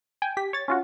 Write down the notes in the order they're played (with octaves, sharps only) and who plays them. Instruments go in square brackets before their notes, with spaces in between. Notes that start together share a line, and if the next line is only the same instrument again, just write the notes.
[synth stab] G5 G#5
G4 B6
C#5 A6
C#4 F4 F#4